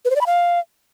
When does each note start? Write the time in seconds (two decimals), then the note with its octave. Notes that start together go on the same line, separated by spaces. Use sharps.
0.05 B4
0.10 C5
0.16 D5
0.21 B5
0.26 F5